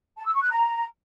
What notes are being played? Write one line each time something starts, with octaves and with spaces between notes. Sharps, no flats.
A5
E6
C#6
F#6
A#5